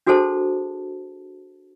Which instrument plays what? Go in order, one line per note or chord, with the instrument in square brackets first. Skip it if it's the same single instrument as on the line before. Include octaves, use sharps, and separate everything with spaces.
[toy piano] D4 F#4 G#4 A4 C5 A5